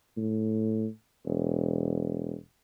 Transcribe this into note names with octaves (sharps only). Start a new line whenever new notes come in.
A2
E1